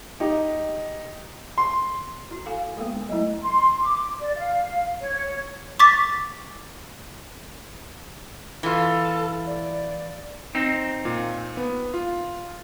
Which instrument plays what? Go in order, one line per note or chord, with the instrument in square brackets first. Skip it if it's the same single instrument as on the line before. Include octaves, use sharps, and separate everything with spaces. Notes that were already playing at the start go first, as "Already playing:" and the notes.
[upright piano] D#4 G4
C6
[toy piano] E4 F#4
[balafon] A4 F5 G#5
[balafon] G#3 A#3 B3 [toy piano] A4 A#4
[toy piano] D4 A#4
[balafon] F#3 A3 E4 [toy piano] D#5
[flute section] C6
D6
D5
F5
C#5
[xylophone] C#6 D6 A6 B6
[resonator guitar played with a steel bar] E3 F4 [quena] A4
[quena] D5
[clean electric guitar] C4 D#4
[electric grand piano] A#2
B3
F4